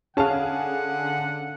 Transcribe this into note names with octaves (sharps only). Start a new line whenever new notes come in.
D3 C#4 G#4 F5 F#5 A5